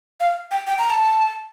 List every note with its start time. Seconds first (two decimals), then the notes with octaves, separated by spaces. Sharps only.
0.20 F5
0.51 G5
0.67 G5
0.78 A#5
0.90 A5